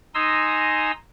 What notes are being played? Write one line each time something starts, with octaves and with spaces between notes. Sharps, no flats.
D#4 G#5 A#5 C6 D#6 E6